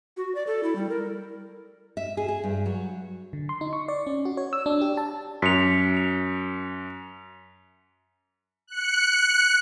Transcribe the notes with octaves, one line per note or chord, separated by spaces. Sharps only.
F#4
D5
A4
E4
G3
A#4
E5
G#4
G#4
G2
F#3
D3
C6
D#4
C#6
D5
C#4
F#4
C#5
E6
D4
G4
A5
F#2 B6 C#7 F7
F7
F#6 C#7